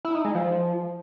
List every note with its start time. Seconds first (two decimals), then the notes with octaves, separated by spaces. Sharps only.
0.05 E4
0.15 D#4
0.25 G#3
0.35 F3